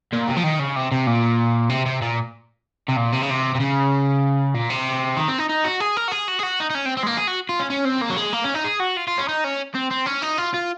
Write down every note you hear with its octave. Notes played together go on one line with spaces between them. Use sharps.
A#2
C3
F3
D#3
C#3
C3
C3
A#2
C3
C3
A#2
C3
A#2
C3
C#3
C3
C3
C#3
A#2
C3
D#3
C4
D#4
D#4
F#4
G#4
A#4
F#4
G#4
F#4
G#4
F#4
D#4
D#4
C#4
C4
C4
G#3
A#3
G#4
F#4
F4
C#4
C#4
C4
A#3
F#3
G#3
A#3
C#4
D#4
G#4
F#4
F4
F4
C#4
D#4
C#4
C4
C4
C#4
D#4
F4
F4